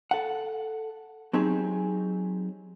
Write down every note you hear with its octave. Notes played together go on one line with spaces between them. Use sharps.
A4 F#5
F#3 C4 D#4 G4 G#4